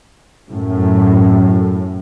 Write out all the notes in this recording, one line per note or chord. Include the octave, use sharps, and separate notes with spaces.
F#2 A2